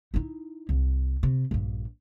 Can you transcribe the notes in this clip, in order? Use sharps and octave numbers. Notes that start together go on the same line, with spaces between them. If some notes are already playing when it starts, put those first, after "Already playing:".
D#4 E4
C2
C3
A#1 G2